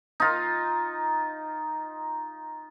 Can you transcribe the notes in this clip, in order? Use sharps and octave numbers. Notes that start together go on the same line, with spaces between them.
D#4 F4